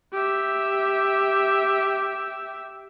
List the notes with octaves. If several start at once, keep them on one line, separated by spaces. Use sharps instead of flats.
G4 E5